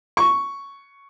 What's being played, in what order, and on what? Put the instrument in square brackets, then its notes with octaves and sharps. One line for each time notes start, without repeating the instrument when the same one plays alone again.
[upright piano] C#6